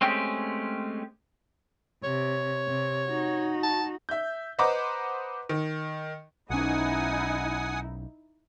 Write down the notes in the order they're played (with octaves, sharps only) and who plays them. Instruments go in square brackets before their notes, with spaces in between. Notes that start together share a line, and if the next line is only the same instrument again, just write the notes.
[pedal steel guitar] G#3 A3 C4 C#4 G4
[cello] C3 [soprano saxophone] C#5
[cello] C3
D#4 F#4
[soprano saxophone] A5
[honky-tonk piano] E5 G6
B4 C5 D#5 F#5 A#5 D6
D#3
[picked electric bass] B1 C#4 [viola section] D#4 E4 [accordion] F#5 G#5 D#6